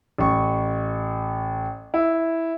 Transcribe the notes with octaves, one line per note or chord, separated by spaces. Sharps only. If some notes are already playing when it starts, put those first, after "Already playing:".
A1 C#6
E4